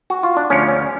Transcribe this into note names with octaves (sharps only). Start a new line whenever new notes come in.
F#4
F4
D4
D2 C#3 F3 C#4
C#4